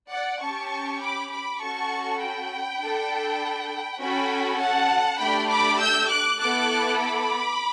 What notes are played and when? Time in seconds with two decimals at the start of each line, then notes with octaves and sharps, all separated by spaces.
0.11 D5 F#5
0.41 C#4 G4 A5 C#6
1.01 B5 D6
1.31 B5 D6
1.61 C#4 F#4 A4 A5 C#6
2.20 G5 B5
2.80 D4 A4
3.99 C#4 F#4 A4 G5 B5
4.59 F#5 A5
5.18 A3 D4 G4 G5 B5
5.49 B5 D6
5.79 E6 G6
6.08 D6 F#6
6.38 B3 E4 A4 D6 F#6
6.99 B5 D6